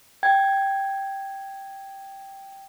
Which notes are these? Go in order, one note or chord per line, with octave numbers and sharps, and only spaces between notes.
G5 G#6